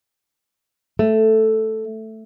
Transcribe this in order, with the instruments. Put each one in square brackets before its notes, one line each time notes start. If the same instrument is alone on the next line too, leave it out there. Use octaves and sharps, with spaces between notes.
[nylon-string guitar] A3